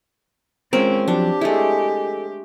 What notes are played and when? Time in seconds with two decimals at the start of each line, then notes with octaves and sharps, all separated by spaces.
0.73 G#3 C4 C#4 F4 A#4
1.08 F2 F3 F#3 D4 G4
1.41 G#3 A3 E4 A4